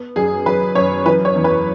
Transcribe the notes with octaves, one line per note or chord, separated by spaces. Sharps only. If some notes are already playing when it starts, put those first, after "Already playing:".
Already playing: B3
F#2 G#4
F#3 B4
F#2 C#5
E3 B4
C#5
E2
B4